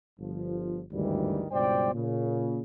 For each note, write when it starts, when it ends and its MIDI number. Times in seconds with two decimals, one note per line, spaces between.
0.19 0.81 31
0.19 0.81 53
0.92 1.46 32
0.92 1.46 38
0.92 1.46 43
0.92 1.46 51
0.92 1.46 52
0.92 1.46 55
1.52 1.93 37
1.52 1.93 43
1.52 1.93 47
1.52 1.93 72
1.52 1.93 74
1.52 1.93 79
1.94 2.61 46
1.94 2.61 49